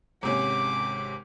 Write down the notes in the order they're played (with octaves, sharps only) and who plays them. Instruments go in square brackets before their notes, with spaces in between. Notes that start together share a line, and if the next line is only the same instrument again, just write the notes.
[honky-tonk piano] G#1 C3 C#4 [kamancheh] D6